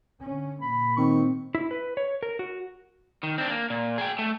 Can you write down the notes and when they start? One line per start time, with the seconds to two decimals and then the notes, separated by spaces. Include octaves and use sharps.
0.21 D3 C#4
0.62 A#2 A#3 B5
0.97 D#3 C4 C#6
1.55 E4
1.71 B4
1.97 C#5
2.23 A#4
2.39 F#4
3.23 D#3
3.38 C4 D4
3.50 A#3
3.70 A#2
3.98 G#4 G5
4.19 A3